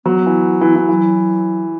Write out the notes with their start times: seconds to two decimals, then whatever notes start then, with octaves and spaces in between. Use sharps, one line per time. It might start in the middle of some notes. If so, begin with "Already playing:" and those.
0.05 F#3 B3
0.26 E3
0.61 E3
0.75 E3
0.89 E3 F#3